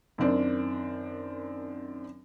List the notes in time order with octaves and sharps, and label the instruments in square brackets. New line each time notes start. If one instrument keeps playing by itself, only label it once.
[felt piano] F#2 D#3 C4 D4